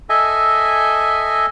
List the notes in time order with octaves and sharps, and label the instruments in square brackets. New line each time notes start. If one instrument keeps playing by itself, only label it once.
[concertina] A4 D#5 E5 G#5